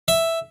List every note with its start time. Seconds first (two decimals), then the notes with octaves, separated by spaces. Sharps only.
0.08 E5